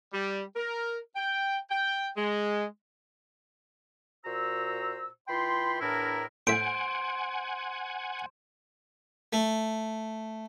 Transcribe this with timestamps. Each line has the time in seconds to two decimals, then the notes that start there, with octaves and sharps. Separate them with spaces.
0.13 G3
0.56 A#4
1.16 G5
1.70 G5
2.17 G#3
4.25 A#2 F#4 C5 A#5 E6
5.28 E3 F4 G5 B5 C6
5.80 E2 A2 D4 E4 A#4
6.47 A2 C5 E5 F#5 G#5 D7
9.33 A3